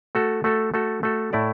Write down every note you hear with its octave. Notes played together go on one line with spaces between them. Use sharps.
A3 F#4 A4
A3 F#4 A4
A3 F#4 A4
A3 F#4 A4
A2 A3 E4 D5